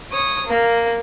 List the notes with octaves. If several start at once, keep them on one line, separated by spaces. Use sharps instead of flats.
C#5 D#6
A#3